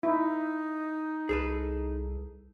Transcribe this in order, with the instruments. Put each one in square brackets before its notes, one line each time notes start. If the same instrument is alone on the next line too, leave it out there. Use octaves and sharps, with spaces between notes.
[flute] D#4 [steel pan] E4
[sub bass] C2 [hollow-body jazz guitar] G#4 A4 B4